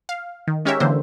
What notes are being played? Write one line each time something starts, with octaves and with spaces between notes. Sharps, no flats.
F5
D#3
G#3 C#4 G4 A#4 C#5 E5
D3 E3 A#3 C5